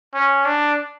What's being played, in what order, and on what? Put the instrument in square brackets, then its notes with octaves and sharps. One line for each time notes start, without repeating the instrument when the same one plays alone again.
[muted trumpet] C#4
D4